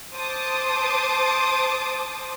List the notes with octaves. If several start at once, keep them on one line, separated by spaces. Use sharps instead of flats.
C5 A5 D6 D#6